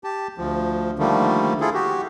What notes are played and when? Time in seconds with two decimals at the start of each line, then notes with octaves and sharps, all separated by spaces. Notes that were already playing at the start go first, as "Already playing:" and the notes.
0.04 G4 A5
0.38 D2 F3
0.99 D3 D#3 F3 G3 A3 A#3
1.61 E4 F4 G#4 A4
1.74 F#4 G4